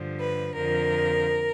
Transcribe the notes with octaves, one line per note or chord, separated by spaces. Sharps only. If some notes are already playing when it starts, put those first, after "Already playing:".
Already playing: G2 D3 F3
B4
F2 D3 F3 A#4